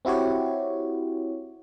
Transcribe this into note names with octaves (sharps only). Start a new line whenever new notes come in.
C4 E4 F#4 G4 C#5